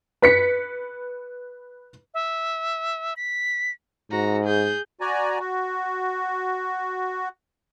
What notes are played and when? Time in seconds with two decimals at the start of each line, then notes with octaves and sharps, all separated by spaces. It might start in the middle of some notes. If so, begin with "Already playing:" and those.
0.22 B4 B6 C#7
2.14 E5
3.16 B6
4.11 G#2 F#4 A#5
4.45 G#4 G6
5.01 F#4 D5 G#5 A#5
5.39 F#4